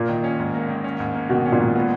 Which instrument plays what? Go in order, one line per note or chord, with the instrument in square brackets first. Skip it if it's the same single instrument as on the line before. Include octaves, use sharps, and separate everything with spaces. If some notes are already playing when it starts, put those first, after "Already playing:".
Already playing: [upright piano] A#2 [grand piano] A#3
[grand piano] D#3
C#4
G#2
A#3
D#3
C#4
G#2
A#3
[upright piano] B2 [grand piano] D#3
[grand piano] C#4
[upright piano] A#2
[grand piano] G#2
B3